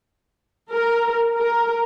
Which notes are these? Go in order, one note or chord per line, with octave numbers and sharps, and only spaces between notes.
A#4
A#4